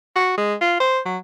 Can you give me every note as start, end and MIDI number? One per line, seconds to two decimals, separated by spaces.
0.16 0.35 66
0.38 0.54 56
0.61 0.79 65
0.80 0.99 72
1.06 1.18 54